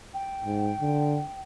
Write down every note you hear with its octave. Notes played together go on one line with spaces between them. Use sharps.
G5
G#2
D3